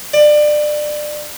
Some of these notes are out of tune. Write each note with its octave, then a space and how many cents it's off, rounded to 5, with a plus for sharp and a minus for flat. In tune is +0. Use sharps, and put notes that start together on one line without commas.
D5 +25